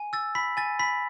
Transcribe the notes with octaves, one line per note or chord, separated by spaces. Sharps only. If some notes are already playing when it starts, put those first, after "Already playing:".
Already playing: G#5
E6 A6
B5 B6
G#5 A6
B5 B6